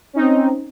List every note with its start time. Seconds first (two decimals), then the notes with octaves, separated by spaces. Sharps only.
0.13 C#4
0.16 D#4
0.19 C4